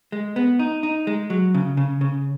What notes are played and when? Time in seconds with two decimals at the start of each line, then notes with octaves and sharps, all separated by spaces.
0.12 G#3
0.36 B3
0.59 D#4
0.83 D#4
1.07 G#3
1.30 F#3
1.54 C#3
1.77 C#3
2.01 C#3